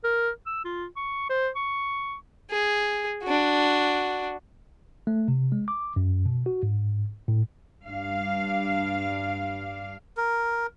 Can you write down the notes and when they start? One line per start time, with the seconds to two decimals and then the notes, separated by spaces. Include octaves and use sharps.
0.04 A#4
0.46 E6
0.65 F4
0.96 C#6
1.29 C5
1.56 C#6
2.50 G#4
3.23 D4 F#4
5.07 A3
5.28 C3
5.52 G#3
5.68 D6
5.96 F#2
6.26 B2
6.46 F#4
6.63 G#2
7.28 A2
7.85 G2 D4 F5
10.17 A#4